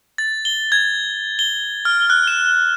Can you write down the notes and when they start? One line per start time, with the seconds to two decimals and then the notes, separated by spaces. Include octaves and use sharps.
0.18 A6
0.45 G7
0.72 G#6
1.39 G7
1.85 F6
2.10 F#6
2.28 E7